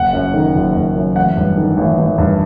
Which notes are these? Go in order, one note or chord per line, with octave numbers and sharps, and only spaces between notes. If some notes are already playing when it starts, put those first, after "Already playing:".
Already playing: F#1 F#5
F#2
D#3
F#1
F#1
F#2
A1 F#5
G2
D#3
A1
A1
G2